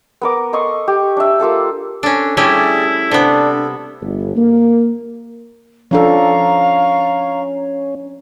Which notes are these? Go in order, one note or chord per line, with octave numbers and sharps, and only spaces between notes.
B3 A#4 D6
A4 D#5 C6 C#6
G4
D4 E5
A#3 F4 A4 A5
C#4 D4 A4
G3 A3 C#4 E4 G4 G#4 D5
C3 B3 D4 A4
G1
A#3
F3 C#4 D4 A4 F5 A#5 C#6